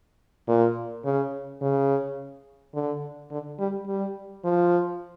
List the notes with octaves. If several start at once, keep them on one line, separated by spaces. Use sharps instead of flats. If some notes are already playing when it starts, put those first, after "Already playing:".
A#2
C#3
C#3
D3
D3
G3
G3
F3